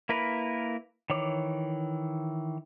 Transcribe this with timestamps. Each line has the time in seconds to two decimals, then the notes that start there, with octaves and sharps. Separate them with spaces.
0.09 A#3 E4 A#4 B4
1.10 D#3 E3 C#5 D6